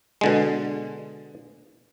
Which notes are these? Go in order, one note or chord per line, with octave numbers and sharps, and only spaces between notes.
B2 D3 G#3